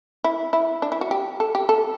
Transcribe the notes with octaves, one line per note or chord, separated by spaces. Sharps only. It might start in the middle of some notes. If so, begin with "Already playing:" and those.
E4
E4
D4
E4
F#4
G4
A4
G4
A4